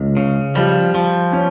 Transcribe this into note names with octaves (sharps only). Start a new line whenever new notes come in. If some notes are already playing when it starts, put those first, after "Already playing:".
Already playing: C#2
C#3
F3 G3
F3
C#4